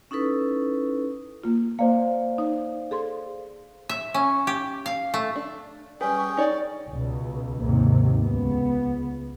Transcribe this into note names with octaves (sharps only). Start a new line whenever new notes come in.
C#4 D#4 E4 A4 B4
A#3 F4
A#3 C5 D5 F5
D#4 C#5
G#4 A4 C6
E5
C#4
G4
F5
A3
D4
G3 C#4 G#4 B4 G5
C#6
D#4 C#5 D5
C#2 B2
D#2 G#2 C3
C#2 B3